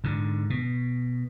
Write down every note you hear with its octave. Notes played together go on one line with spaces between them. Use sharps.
G#2 D3
B2